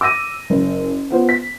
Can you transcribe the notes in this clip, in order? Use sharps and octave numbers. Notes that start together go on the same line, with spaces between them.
D6 E6 A#6 D#7
F#1
B3 F4 C5
B6